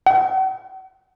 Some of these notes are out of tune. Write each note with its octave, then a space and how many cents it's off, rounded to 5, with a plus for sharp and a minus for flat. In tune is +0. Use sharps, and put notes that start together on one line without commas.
F#5 +45